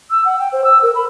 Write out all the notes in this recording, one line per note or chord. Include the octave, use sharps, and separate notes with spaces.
E6
F#5
G5
C5
E6
A#4
B5